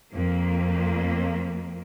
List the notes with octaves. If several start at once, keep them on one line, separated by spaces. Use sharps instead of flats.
F2 A#3